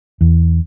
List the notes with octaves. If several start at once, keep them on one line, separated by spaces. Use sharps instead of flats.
E2